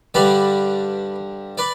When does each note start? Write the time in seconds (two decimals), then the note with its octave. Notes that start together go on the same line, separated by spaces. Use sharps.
0.14 G2 D3 G3 B4 D5
1.58 B4 D5